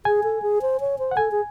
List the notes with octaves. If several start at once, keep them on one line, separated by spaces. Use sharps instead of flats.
G#4 G#5
A4
G#4
C5
C#5
C5
F#5
A4 G#5
G#4